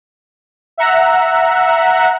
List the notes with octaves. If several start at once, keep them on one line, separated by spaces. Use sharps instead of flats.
E5 F#5 A#5